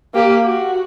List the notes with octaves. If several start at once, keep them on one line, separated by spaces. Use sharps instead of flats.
A#3 G4
F#4